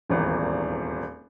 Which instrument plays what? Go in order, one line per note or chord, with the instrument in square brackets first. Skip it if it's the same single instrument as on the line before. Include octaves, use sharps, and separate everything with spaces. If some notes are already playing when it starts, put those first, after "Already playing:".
[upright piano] D#1 G#1 E2